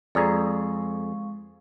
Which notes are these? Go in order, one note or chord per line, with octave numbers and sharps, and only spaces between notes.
F2 G#3 G#4 D5 F5 A#5 C#6